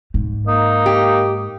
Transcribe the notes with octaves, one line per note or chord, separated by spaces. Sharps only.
G#2
A#3 D#4
G4